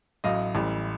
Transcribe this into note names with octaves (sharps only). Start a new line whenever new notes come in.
A1 A2 F#3 D#5 F5
A1 A2 E3 G3